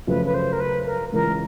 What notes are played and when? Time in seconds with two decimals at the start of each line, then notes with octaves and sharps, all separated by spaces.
0.07 F#2 C#3 F3 A3 B4
0.26 B4
0.34 C5
0.52 A#4
0.60 B4
0.86 A#4
1.12 C#2 C#3 E3 G#3 A#4